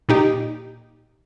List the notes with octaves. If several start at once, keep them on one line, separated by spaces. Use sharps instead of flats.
A#2 D#4 G4